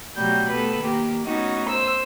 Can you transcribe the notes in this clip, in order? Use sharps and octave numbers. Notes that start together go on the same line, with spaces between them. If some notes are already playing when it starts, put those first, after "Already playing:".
B2 F#3 G3 A3 G6
A3 B3 A4 B4
D#3 A#3 G4
A3 B3 C#4 D#4 F#4
C5 E6